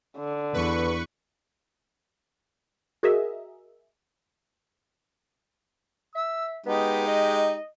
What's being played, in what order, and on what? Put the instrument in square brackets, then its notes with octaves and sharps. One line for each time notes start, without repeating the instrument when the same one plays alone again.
[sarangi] D3
[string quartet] E2 [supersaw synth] B4 C#6
[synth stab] F#4 G#4 A#4 D#5 E5
[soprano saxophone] E5 [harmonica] E6
[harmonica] G#3 D#4 G4 [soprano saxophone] B3
[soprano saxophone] D#5